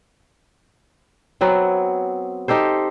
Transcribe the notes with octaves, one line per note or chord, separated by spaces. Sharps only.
F#3 B3 C4
D#4 G4 A4 C5